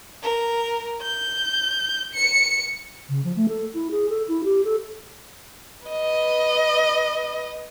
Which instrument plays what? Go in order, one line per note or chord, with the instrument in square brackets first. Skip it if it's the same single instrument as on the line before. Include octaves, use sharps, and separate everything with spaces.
[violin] A#4
G6
C#7
[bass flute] C#3
F3
A3
A4
E4
G#4
A4
E4
G4
A4
[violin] B4 D#5